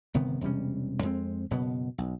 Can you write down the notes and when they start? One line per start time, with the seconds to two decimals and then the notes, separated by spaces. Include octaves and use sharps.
0.14 G1 C3 D#3 B3
0.41 E1 C3 G3 C#4
1.02 F2 G#3 B3 C4
1.51 F#1 B2 B3
1.98 B1